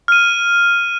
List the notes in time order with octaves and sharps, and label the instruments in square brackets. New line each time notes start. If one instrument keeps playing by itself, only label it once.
[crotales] F6 D#7